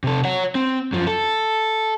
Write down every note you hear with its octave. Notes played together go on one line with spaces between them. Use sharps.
C3 A4
C#5 F#5
C4
F#2 F3
A4